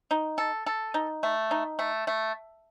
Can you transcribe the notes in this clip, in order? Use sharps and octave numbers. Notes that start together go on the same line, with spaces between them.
D#4
A4
A4
D#4
A3
D#4
A3
A3